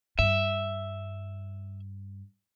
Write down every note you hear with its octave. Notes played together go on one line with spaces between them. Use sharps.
G2 E5